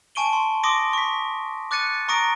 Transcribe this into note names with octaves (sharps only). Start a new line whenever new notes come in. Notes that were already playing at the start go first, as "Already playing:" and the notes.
G#5 A5 C#6 D7 D#7 G7
C6
C6 D6 D#6 A#6 D7
C#6 B6
D6 F#6 A6 C#7 D#7
A#5 C#6 D#6 A#6 D7